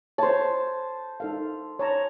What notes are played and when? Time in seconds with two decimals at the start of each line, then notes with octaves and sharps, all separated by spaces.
0.18 C5 C#5 A5
1.20 D#4 A4 F5
1.79 C#5 A5 A#5